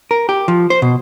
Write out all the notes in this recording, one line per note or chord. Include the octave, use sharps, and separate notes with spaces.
A#4
G4
F3
C5
B2